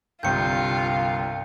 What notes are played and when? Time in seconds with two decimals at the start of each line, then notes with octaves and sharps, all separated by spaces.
0.23 G1 C2 F4 G5 G6 C#7